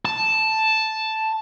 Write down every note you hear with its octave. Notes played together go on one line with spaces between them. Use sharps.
A5